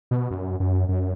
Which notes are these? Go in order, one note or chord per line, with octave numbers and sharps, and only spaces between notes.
B2
F#2
F#2
F#2